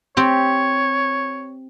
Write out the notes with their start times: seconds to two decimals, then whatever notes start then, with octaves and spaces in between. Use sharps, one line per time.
0.17 C4 G4 C#5